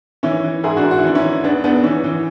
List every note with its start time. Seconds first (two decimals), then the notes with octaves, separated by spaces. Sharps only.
0.23 E3 C#4 E4
0.44 E3
0.64 G#2 E4 G#4
0.77 D4 F#4
0.83 G#2
0.91 F#4
0.98 E4
1.04 E3 D4
1.15 C#4 E4
1.24 E3
1.44 E2 B3 D4
1.64 E2 B3 D4
1.83 E3 C#4
2.04 E3